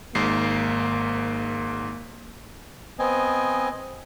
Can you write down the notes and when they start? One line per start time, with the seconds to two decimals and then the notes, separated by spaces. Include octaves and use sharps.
0.15 G#1 G#2 A#3 C7
2.99 B3 C4 D#5 G#5